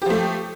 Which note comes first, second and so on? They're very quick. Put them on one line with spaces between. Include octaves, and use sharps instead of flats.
G4 F3 A3